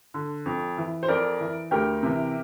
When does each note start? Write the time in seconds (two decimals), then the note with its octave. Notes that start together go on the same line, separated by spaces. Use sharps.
0.14 D3
0.46 F2
0.77 E3
1.03 C5
1.08 F2 A#4 D5
1.40 E3
1.71 D2 G4 A#4
2.03 C3 E3